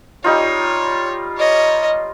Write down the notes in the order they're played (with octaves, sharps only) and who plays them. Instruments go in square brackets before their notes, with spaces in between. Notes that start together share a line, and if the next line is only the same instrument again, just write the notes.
[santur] G3 D#4 F4 [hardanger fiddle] C#5
[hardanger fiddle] C#5 D#5